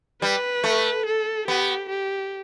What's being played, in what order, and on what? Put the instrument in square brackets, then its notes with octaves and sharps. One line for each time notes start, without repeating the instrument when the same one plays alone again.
[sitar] G3 [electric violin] B4
[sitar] A3
[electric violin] A4
[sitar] B3 [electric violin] G4
[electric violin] G4